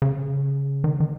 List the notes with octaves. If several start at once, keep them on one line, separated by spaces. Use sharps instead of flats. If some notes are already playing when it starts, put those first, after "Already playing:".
C#3
D#3
D#3